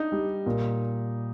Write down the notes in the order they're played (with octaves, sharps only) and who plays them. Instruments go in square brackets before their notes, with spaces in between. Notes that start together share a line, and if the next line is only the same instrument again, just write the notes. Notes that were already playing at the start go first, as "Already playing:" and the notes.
Already playing: [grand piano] D4 [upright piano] D#4
[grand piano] G3
A#2